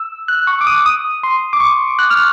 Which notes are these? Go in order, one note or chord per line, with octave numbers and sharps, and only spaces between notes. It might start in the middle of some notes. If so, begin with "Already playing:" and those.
Already playing: E6
F#6
C#6
D6
D#6
D#6
C6
D6
C#6
F#6
F6